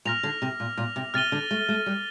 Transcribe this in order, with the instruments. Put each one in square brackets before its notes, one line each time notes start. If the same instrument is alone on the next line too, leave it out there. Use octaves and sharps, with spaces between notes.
[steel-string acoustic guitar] A#2 [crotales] F6 A#6 F7
[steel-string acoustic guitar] D3
C3
A#2
A#2
C3
[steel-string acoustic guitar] C3 [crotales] F6 A6 D#7 G7
[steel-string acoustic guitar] D3
A3
A3
G3